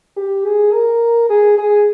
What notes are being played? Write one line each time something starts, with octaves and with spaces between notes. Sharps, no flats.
G4
G#4
A#4
G#4
G#4